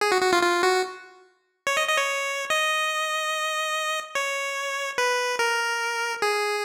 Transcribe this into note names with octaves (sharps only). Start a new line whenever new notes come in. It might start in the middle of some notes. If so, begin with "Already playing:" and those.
G#4
F#4
F#4
F4
F4
F#4
C#5
D#5
D#5
C#5
D#5
C#5
B4
A#4
G#4